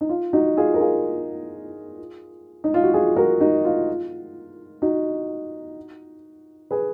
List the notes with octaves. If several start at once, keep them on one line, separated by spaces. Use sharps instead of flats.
D#4
F4
D#4 F#4
F4 G#4
A#4
F4 G#4
D#4
F4
F#4
F4 G#4
F#4 A#4
D#4 F#4
F4
D#4 F#4
G#4 B4